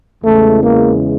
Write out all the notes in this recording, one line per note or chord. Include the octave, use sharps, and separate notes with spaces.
E2 C#3 E3 G#3 A3
A#3